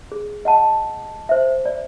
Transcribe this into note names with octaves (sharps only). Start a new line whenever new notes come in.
G#4
D#5 F#5 A5
C5 E5
D5